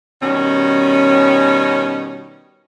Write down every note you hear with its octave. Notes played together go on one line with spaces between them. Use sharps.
B2 D#3 G3 C#4